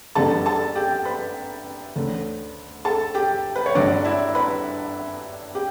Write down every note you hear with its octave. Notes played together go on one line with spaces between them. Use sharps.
G1 F#2 D3 G3 B3 A4 A5
A4 A5
G4 G5
B4 B5
D2 D3 A3 C#4
A4 A5
G4 G5
B4
C#5
G1 G2 D3 F#3 D4 D5
E4 E5
B4 B5
G4 G5